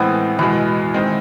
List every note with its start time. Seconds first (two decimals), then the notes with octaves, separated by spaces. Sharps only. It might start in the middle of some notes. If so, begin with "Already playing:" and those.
Already playing: A2 E3 G#3 B3 C4
0.39 E2 B2 G#3 E4
0.94 D#3 G#3 C4